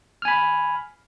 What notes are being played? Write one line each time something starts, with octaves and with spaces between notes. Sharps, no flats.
G#5 B5 F6